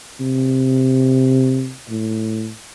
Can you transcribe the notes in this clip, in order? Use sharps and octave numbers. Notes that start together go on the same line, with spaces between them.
C3
A2